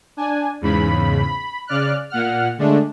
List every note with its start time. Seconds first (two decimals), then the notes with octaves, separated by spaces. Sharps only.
0.17 D4 G#5
0.61 E2 G#2 C#3 B5
1.23 B5
1.67 C#3 D5 F6 F#6
2.10 A#2 F#5 F6
2.58 D3 G#3 A3 D4